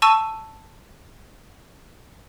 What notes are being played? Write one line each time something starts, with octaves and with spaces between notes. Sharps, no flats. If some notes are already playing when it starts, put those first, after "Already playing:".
A5 C#6 E6 D#7